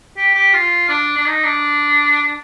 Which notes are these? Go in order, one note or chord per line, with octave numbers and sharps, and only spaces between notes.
G4
G4
F4
D4
D4
D#4
D4